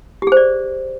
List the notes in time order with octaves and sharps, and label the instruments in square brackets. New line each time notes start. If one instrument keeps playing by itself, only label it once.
[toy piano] G4
G#4
C5
D5